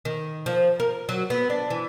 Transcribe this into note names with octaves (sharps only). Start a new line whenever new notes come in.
D#3
F3
A#4
F#3
B3
D4
E3